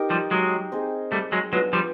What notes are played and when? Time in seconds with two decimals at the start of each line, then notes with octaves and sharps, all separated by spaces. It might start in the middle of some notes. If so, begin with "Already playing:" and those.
Already playing: D#4 G4 A#4
0.10 F3 G3
0.31 F#3 G#3
0.72 C4 D#4 G#4 C5
1.12 G3 A3
1.32 F#3 G#3
1.52 F#3 G#3 B3 D4 F4
1.73 F3 G3